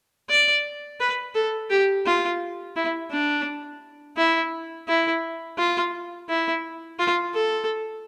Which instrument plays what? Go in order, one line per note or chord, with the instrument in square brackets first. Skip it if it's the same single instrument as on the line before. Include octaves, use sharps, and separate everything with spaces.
[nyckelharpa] D5
B4
A4
G4
F4
E4
D4
E4
E4
F4
E4
F4
A4